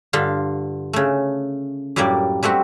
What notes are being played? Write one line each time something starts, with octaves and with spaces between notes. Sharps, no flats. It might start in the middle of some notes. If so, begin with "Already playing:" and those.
G2 D3 F4
C#3 A3
F#2 A2 G3 A#3 D5
G3 A3 C4 F#4